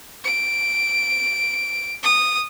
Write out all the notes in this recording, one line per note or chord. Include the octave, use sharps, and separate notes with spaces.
D7
D#6